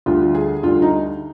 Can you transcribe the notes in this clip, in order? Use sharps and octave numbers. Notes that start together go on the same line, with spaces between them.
D2 D3 G3 F4
G#4
D2 D3 G3 F4
D#4